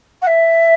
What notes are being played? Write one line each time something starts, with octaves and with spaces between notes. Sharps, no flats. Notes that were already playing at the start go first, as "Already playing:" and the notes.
F#5
E5